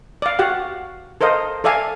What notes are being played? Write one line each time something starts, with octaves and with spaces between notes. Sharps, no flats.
D5 F5
F#4 G4 F5 F#5
A4 A#4 C5 D#5 F5
A4 D5 E5 F5 G#5